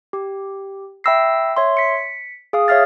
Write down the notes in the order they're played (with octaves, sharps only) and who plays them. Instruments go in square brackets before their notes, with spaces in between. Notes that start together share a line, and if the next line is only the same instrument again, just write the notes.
[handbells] G4
E5 G5 B5 E6 A#6 C7
C#5 E5 C6
B6 C#7
G#4 F5 D#6
C#5 E5 F5 F6 A6